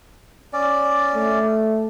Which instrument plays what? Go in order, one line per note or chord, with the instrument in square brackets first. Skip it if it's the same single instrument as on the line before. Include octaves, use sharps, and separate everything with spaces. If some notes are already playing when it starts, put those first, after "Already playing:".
[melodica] C#4 D5
[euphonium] A3